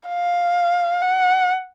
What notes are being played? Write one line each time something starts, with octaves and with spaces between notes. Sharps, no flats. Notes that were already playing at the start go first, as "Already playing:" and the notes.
F5
F#5